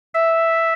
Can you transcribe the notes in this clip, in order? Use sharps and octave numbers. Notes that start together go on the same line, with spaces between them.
E5